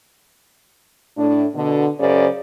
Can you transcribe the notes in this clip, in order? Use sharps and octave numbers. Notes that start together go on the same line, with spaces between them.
A2 D4
B2 D3
F#2 C#3 C5 D5